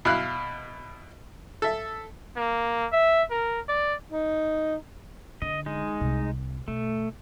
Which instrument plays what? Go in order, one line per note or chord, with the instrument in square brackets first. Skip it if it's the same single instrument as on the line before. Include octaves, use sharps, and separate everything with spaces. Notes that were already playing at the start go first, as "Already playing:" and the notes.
[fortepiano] B2 E4 F5 F6 F#6
A4 E5
[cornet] A#3
E5
A#4
D5
[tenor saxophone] D#4
[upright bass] D3 [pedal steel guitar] D#5
[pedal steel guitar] G#3 D#4
[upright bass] C2 C3
[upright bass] B2 [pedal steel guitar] A3